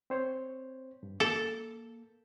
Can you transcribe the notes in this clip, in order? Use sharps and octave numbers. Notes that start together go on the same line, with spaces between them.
C4 C5 C#5
G2
A#3 A4